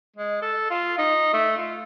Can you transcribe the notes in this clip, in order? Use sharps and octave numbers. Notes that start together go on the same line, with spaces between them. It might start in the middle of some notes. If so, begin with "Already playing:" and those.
G#3
A4
F4
D#4
A3
F4